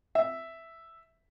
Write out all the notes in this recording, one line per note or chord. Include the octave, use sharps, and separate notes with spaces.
E5